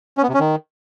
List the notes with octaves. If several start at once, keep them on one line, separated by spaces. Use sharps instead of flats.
C#4
B3
C3
C#4
D#3